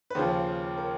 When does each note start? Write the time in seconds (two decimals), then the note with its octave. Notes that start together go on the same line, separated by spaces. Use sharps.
0.10 B4
0.15 D#2 C#3 F3 C5
0.77 A#4